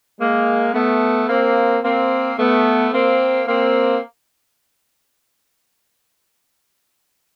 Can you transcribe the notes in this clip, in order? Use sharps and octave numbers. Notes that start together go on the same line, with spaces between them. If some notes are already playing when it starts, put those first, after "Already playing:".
G#3 A#3
A3 B3
A#3 C4
A#3 C4
A3 B3
A#3 C4
A#3 C4